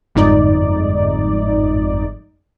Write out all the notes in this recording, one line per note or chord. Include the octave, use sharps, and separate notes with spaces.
G1 F2 G#2 D#4 D5